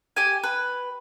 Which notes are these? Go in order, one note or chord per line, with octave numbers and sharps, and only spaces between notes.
G4 G#5
B4